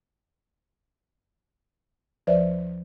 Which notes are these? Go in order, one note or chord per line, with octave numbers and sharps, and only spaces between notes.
D2 F3 B4 C5 D5 E5